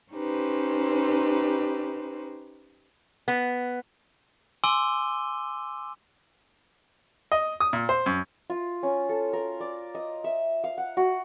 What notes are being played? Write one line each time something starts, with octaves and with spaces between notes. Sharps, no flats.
C#4 D#4 G4 B4 C5
B3
G#5 C6 D6 E6 D#7 G7
D#5
D#6
A#2
C5
F#2
F4
C#4
A4
A#4
D5
D#5
E5
F5
F#5
F#4